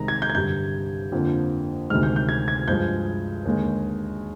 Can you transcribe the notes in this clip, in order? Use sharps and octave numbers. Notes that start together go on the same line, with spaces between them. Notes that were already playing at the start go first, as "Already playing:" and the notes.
Already playing: C2 C3 D#3 G#3 A#5
G#6
G6
G#6
G2 D3 G3 G6
F2 D3 F3 A#3
D2 C3 D#3 G#3 F6
G6
G6
G#6
G#6
G2 F3 G#3 G6
D#2 D3 G#3